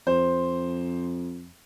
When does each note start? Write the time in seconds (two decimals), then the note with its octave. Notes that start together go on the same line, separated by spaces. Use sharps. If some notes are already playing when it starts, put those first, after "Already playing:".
0.07 F2 C5